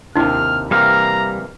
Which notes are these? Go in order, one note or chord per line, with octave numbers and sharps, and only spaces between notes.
D#2 C3 D4 E4 F6
C3 E3 G3 A#3 F5 A#5